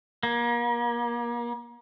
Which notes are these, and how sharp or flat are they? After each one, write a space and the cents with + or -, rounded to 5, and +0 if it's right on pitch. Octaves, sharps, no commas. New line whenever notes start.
A#3 +35